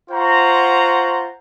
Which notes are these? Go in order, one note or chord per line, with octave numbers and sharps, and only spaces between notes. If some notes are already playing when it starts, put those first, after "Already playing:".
F4 C5 F#5 A#5 C#6